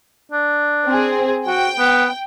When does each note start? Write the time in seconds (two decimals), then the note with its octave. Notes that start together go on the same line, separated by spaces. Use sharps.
0.32 D4
0.87 C4 G#4
1.47 F#4 G5
1.79 B3